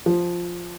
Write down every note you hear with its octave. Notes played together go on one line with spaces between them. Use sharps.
F3